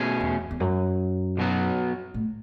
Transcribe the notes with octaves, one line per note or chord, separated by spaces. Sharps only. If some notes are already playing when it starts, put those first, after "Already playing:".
Already playing: B2 A3 C#4 G#4
E2
E2
F#2
B1 B2 F#3 B3
A2